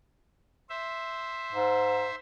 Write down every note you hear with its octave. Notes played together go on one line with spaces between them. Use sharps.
C5 E5
G#2